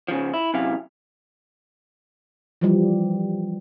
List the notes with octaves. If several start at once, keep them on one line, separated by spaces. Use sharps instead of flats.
C#3 F3
E4
F#2 C3 E4 F5
E3 F3 G3